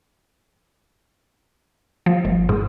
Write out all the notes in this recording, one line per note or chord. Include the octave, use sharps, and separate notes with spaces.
F3
G1
G#2